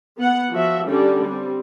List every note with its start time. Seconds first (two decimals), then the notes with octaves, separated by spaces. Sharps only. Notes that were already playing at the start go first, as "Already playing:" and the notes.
0.18 B3 F#5
0.52 F3 F#4 E5
0.87 D3 G3 C#4 D4
1.27 G3 C4